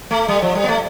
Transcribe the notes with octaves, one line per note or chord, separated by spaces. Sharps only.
A3
G3
F3
G3
B3
A3